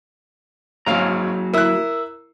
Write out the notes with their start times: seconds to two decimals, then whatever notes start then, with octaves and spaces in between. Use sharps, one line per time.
0.86 G#1 F#3 A#3 C#4 F5 A#5
1.54 E4 A#4 E6 F#6